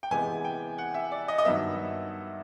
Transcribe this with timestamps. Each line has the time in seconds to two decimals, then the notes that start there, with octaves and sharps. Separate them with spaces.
0.03 G5
0.11 C3 E3 G#3 B3 G#5
0.45 G5
0.78 F#5
0.94 E5
1.11 D5
1.28 D#5
1.38 D#5
1.45 G2 D#3 F#3 B3 E5